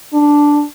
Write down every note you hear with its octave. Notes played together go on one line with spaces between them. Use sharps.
D4